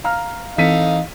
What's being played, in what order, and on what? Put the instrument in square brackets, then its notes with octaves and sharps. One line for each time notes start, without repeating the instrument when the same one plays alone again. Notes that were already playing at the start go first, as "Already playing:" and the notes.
[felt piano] F5 A#5 F6
[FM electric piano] E3 C4 [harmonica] D#4 F5 [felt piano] A4 B6 D#7